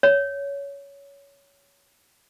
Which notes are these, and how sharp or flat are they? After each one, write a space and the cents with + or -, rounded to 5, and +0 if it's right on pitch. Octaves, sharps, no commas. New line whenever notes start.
C#5 +15